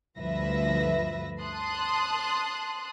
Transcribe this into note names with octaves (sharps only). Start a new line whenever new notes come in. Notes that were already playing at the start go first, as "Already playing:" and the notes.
D2 G2 F3 B4 E5 A#6
A5 C6 D#6 F#6